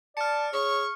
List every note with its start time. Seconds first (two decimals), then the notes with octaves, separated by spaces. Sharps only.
0.17 D5 A5 F6 C#7
0.53 G#4 C#5 C#6